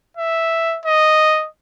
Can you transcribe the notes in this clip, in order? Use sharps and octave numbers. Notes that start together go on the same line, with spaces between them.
E5
D#5